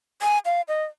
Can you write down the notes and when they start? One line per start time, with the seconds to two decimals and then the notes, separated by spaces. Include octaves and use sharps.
0.22 G#5
0.45 F5
0.68 D#5